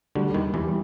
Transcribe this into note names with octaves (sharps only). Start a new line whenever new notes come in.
D2 D3 G3
D#2 D#3
E2 E3 G3